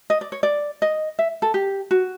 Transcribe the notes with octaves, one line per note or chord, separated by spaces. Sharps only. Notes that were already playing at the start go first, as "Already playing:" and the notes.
D#5
D5
C#5
D5
D#5
E5
A4
G4
F#4